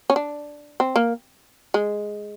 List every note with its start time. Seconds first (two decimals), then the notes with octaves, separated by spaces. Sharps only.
0.10 C#4
0.16 D4
0.80 C4
0.96 A#3
1.74 G#3